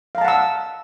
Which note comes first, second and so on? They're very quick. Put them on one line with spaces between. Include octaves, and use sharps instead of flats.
F5 A#5 A5 F#5 E6